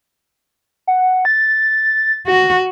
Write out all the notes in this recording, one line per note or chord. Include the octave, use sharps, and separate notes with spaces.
F#5
A6
F#4